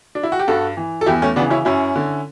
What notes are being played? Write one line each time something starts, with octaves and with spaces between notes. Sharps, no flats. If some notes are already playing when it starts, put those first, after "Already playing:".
D4
E4
F#4
G4
G2 F#4 A4
E3
A4
E2 E4 G4
A3 C#4
C#3 E3 B3 D4
C#4 E4
F#2 C#4 E4
D3